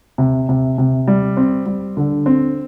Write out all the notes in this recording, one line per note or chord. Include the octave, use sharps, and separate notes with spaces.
C3
C3
C3
G3
C4
G3
D3
C4